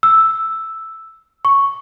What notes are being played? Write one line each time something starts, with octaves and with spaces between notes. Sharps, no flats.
E6
C#6